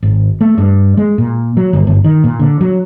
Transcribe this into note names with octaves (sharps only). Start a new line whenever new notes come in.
G#1
A3
G2
G#3
A#2
F#3
G1
G1
D#3
A#2
D3
F#3